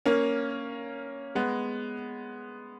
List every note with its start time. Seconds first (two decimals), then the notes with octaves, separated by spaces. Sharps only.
0.06 A#3 C#4
1.35 G#3 B3